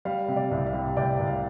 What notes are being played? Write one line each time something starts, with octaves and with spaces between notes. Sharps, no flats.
G3 F5
C3
D5
C2
F5
G3
C2 D5 G5
C2
F5